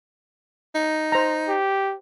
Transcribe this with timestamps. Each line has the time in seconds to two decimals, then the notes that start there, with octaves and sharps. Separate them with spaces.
0.75 D#4
1.12 C5 A#5
1.48 G4